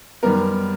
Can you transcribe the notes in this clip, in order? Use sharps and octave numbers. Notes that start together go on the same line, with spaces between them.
F#2 D#3 G3 B3 A#4